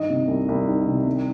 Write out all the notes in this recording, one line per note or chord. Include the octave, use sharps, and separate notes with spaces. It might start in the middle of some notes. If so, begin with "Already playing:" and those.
Already playing: G2 D#3 D#5
C3
C2
C2
D#3
C3
C2